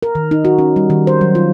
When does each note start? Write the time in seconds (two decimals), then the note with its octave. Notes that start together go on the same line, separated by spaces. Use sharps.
0.03 A#4
0.15 D#3
0.31 D#4
0.45 F#4
0.59 C#4
0.76 G3
0.90 D#3
1.07 C5
1.21 F#3
1.35 F4